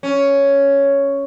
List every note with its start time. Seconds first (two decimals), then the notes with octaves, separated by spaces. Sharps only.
0.03 C#4